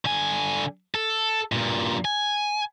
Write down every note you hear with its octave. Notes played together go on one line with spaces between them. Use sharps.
D3 G#5
A4
G2 A#2
G#5